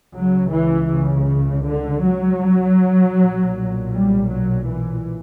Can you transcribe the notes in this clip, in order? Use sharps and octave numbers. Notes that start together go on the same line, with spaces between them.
C#2 C#3 F#3
E3
C#3
D3
F#3
B1 A#2
G3
F#3
E3